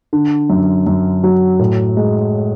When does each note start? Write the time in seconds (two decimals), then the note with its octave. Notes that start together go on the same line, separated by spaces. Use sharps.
0.13 D3
0.50 F#2
0.87 F#2
1.24 F#3
1.59 A2
1.97 G#3